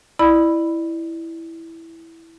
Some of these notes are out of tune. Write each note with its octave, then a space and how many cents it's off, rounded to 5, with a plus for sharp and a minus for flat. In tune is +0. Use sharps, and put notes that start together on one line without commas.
E4 +0 D5 +30 B5 +0